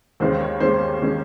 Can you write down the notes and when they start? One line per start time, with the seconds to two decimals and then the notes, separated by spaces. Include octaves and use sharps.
0.20 D#2 D#3 G#3 C#4 C5
0.41 C#5
0.60 D#2 D#3 G#3 C#4 C5
1.02 D#3 G#3 C#4